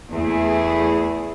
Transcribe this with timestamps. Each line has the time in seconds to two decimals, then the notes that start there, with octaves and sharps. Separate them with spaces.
0.12 E2 A3 E4 G#4